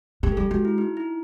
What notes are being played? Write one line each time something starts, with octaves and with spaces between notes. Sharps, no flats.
G#3 G4
A4
G3 G#4
G#3 F#4
E4
D#4
E4